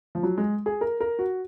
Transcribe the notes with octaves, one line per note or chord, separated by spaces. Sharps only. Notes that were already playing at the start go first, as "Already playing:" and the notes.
F3
F#3
G#3
G#4
A#4
A#4
F#4